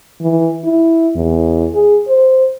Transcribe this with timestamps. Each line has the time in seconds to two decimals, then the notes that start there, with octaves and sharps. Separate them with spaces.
0.21 E3
0.64 E4
1.16 E2
1.74 G#4
2.08 C5